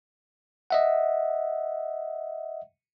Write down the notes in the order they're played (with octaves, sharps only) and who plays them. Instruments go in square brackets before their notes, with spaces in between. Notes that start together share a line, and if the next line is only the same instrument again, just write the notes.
[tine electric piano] D#5 E5 F#5